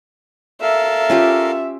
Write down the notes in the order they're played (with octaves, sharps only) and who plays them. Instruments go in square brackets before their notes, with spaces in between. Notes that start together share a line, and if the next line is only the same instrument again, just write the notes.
[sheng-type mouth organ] A4 A#4 F5 [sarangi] E5
[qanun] C#4 F4 G4